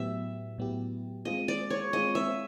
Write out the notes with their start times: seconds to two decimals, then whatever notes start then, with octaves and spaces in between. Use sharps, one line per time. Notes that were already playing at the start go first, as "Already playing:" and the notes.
Already playing: A2 F#3 B3 E4 G4 E5
0.58 A2 F#3 B3 E4 G4
1.25 G#3 C4 F4 G#4 D#5
1.48 D5
1.70 C#5
1.93 G#3 C4 F4 G#4 D#5
2.15 E5